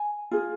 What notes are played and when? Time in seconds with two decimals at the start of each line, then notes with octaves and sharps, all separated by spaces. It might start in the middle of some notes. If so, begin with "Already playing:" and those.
Already playing: G#5
0.31 F4 G#4